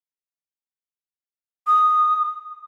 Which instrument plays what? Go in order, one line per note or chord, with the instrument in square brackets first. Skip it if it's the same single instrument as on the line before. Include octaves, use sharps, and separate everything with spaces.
[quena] D#6